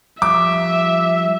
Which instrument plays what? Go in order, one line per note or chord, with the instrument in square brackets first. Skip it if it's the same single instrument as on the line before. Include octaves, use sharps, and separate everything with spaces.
[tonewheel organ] F3 G3 [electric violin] E5 [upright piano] D6